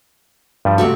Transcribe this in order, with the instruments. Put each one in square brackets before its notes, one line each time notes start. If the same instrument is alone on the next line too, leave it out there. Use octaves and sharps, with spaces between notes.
[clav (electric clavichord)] G2 F3 G3
[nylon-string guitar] C3 A3 F#4